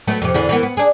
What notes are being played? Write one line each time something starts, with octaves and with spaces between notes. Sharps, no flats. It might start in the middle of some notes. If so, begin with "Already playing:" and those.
F#3 A3 B3
F2 C3
E2 D3 E3
E3 A#3 B3
B3
D4 G#4